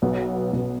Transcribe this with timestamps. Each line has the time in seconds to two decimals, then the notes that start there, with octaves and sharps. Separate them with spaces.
0.02 B1 B2 B3
0.53 B1 B2 B3